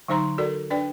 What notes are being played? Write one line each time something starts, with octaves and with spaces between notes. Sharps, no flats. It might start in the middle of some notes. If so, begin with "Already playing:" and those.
D3 F#3 D#4 C5 A#5 C6
F#4 A4 A#4 D5
D4 B4 D5 G5